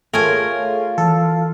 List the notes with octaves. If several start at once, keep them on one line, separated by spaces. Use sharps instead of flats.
A3 F4 G#4 A#4 C#5 G#5
E3 A4